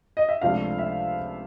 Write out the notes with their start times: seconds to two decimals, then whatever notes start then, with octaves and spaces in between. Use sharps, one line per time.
0.17 D#5
0.29 E5
0.42 C#2 C3 F3 A3 D4 F5
0.79 E5